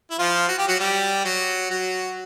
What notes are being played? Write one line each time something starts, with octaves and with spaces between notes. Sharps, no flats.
E4
F3 F4
F#4
G4
F#3 F#4
G3 G4
F#3 F#4
F#3 F#4